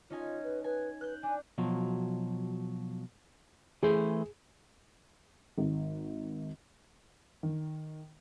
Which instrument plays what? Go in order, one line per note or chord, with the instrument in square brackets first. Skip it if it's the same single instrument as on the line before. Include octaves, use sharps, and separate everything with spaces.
[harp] C#4 D#4 G#5 [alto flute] F4
[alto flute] B4
[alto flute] B4 [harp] G#5
[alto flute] B4 [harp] F#6 G6
[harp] D4 [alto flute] G#5
[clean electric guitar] B2 F3 F#3
[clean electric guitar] E3 A3 C5 [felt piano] G#4
[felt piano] G#1
[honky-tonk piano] D#3